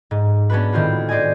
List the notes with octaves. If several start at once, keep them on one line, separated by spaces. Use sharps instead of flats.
G#2
B3 C#4 D4 F#4 B4
A2 D#3 C4 F4 F#4
C5 D5 D#5 G#5